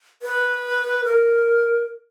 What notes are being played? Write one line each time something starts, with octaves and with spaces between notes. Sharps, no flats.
B4
A#4